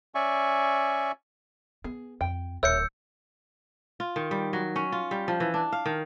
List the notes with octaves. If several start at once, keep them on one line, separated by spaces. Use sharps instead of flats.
C#4 D5 E5 G#5 C#6
B3 G#4
F2 G5
D1 A#4 C#5 E5 E6 G6 C#7
F4
D#3
G3
F#3
C#4
F4
G3
F3
E3
D4
F5
D#3